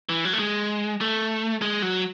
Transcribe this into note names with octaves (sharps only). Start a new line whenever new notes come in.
E3
F#3
A3
G#3
A3
G#3
F#3